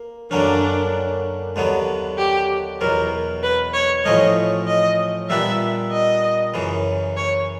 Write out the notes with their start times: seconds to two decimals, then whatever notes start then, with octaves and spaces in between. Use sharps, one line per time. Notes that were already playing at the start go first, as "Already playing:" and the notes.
Already playing: A#3
0.31 F#2 D3 F#3 A#3 C#4 D4
1.56 D#2 D3 F#3 B3
2.18 G4
2.80 E2 B2 F#3 A#4
3.43 B4
3.74 C#5
4.05 A1 A2 F3 A3 C#4 D#5
4.67 D#5
5.30 A#2 G3 B3 D4 E5
5.92 D#5
6.54 F#2 C#3 E3
7.17 C#5